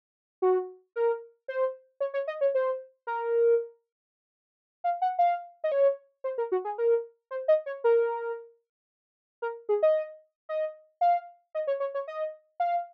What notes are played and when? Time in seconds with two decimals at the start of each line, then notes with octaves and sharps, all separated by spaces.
0.42 F#4
0.96 A#4
1.48 C5
2.00 C#5
2.14 C#5
2.28 D#5
2.41 C#5
2.55 C5
3.07 A#4
4.84 F5
5.02 F#5
5.19 F5
5.64 D#5
5.72 C#5
6.24 C5
6.38 A#4
6.52 F#4
6.65 G#4
6.78 A#4
7.31 C5
7.48 D#5
7.66 C#5
7.84 A#4
9.42 A#4
9.69 G#4
9.83 D#5
10.49 D#5
11.01 F5
11.55 D#5
11.67 C#5
11.80 C#5
11.95 C#5
12.08 D#5
12.60 F5